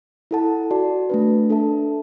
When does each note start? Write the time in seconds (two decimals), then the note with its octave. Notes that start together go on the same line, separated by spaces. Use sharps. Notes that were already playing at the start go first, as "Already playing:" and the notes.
0.31 E4 A4 F#5 A5
0.71 F#4 D5 A5
1.10 A3 D4 B4
1.50 D4 A4 E5 A5